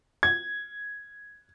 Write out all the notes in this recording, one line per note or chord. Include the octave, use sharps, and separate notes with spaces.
G#6